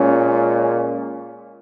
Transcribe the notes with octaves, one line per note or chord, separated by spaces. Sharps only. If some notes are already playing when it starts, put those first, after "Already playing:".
Already playing: A#2 G#3 C#4